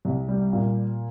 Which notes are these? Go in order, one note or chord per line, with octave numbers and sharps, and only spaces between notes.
C2
G3
A#2